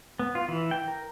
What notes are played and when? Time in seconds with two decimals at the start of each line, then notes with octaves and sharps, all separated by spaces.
0.19 B3
0.35 F4
0.48 E3
0.71 G5
0.88 A#4